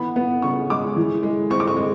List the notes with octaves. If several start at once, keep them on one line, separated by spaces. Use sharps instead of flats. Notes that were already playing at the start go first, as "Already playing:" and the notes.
Already playing: E3 B3 B5
B3
C#3 C#6
G#3 D6
E3
G#3
C4 C#6
D6
C#6
G#3